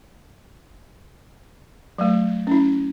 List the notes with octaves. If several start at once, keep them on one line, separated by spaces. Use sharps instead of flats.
F#3 A3
C#4 E4